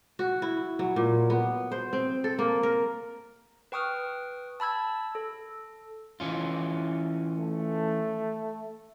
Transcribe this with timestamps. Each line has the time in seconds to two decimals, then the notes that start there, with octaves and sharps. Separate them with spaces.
0.19 F#4
0.42 E4
0.79 F#3
0.96 A#2
1.30 B3
1.72 C5
1.93 C4
2.24 A4
2.39 A#3
2.63 A#4
3.72 B4 G5 C#6 D#6 F6
4.60 A5 B5 E6 G#6
5.15 A4
6.20 E3 C#4 F4
7.39 A3